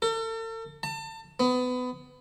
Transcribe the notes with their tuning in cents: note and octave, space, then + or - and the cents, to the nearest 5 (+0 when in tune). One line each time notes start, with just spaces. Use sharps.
A4 +40
A5 +30
B3 +25